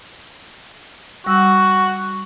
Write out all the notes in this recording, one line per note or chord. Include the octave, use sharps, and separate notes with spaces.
G3 F#4 F#5 E6